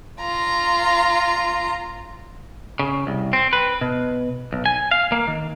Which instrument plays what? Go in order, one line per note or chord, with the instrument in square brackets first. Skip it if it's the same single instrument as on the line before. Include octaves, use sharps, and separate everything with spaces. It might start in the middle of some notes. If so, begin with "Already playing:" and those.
[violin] F4 A#5
[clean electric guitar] C#3
C2
C4
B4
B2
B1
G#5
F5
A#3
D#3